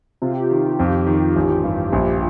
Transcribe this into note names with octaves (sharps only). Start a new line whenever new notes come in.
C3 F4
G4
F4
D#3
F2 G4
D#3
A1
G2
A#1